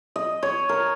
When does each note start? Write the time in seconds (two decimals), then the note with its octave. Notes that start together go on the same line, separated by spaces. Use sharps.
0.16 D#5
0.43 C#5
0.69 A#4